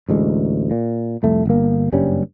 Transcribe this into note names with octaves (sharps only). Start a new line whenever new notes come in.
A1 D2 G#3
A#2
C2 F2 A3
G1 A#3
F#1 G2 G3 C#4